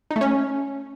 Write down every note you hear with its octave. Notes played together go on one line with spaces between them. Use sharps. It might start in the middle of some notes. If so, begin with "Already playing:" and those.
D#4
A3
C#4